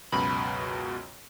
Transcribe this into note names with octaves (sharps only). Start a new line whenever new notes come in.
C#2 F#2 B2 B5